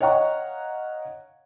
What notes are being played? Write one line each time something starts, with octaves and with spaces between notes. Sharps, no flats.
C#5 D#5 F5 F#5 A#5 C#6